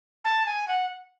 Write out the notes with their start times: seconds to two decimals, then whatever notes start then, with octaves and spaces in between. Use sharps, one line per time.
0.25 A5
0.46 G#5
0.68 F#5